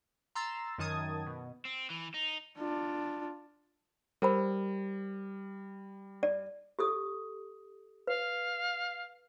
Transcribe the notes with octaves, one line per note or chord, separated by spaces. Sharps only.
A#5 C6 E6 A6
F#2 D#3 A5 D#6 G#6
B2
C4
E3
D#4
D4 F4
G3 A#4 C5 B5
D5
G4 A4 D#6
B4 F5